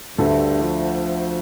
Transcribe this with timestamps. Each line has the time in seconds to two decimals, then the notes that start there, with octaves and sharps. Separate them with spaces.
0.18 D2 G2 D3 A3
0.62 F3